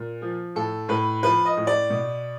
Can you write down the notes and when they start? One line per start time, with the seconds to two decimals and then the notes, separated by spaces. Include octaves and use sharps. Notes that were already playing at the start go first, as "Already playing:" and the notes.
Already playing: A#2
0.22 F3
0.55 A2 A4
0.88 A2 B4
1.23 F3 B4
1.45 D#5
1.57 A2
1.67 D5
1.90 B2